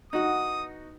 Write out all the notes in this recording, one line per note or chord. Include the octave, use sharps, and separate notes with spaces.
E3 B3 D#4 F#4 D#6